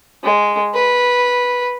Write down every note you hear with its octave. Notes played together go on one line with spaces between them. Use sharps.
G#3
B4